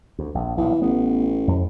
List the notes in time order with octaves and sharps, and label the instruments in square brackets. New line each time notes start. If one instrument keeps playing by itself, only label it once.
[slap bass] D2
A#1
[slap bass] B1 A#2 [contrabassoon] E3
[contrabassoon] A1 [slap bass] B3
[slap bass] F2